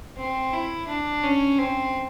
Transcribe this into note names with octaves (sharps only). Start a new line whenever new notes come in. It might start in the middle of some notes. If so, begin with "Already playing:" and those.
C4
E4
D4
C#4
C4